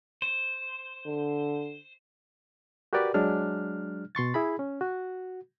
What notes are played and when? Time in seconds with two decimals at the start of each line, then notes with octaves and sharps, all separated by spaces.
0.22 C5
1.06 D3
2.93 F#4 G4 A#4 B4 D5
3.14 F#3 G#3 D4 F6
4.15 B2 C6 C#6 A6
4.34 E4 G#4 B5
4.59 C#4
4.81 F#4